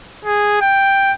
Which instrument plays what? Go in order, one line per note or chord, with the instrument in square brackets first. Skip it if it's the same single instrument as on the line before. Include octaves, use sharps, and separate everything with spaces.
[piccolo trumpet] G#4
G5